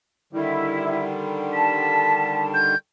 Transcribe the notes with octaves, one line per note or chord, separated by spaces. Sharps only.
D3 D#3 G3 E4
A5 B6
G6